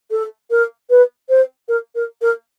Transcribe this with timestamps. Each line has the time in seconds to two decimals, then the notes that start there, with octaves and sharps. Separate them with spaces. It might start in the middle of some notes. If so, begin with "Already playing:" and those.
0.11 A4
0.50 A#4
0.90 B4
1.29 C5
1.68 A#4
1.95 A#4
2.21 A#4